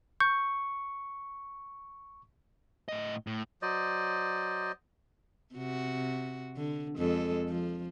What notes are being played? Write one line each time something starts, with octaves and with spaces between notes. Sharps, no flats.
C#6 G6
A2 D#5
A2
F#3 C5 D5 D#5
C3 F#4
D3
F2 G#3 A4
F3